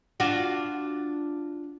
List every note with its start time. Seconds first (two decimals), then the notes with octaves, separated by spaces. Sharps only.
0.20 D4 F4 F#4